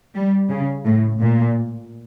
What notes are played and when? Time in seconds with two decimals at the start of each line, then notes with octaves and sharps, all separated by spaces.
0.15 G3
0.50 C#3
0.85 A2
1.21 A#2